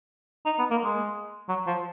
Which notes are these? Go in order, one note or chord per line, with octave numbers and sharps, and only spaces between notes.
D#4
B3
A#3
G#3
F#3
F3